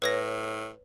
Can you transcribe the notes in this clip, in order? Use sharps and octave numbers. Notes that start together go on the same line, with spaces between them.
A2 B4 C#5 A#6